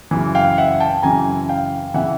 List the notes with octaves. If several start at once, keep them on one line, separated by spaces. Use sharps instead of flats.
F#2 C#3 E3
F5 G5
E5 F#5
G5 A5
F#2 C#3 E3 G#5 A#5
F5 G5
C#3 E3 E5 F#5